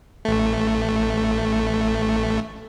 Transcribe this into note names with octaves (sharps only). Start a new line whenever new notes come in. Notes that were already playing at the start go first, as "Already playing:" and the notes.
A1 A3